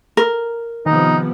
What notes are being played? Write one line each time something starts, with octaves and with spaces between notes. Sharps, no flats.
A#4
C3 D#3 F3 B3 D#4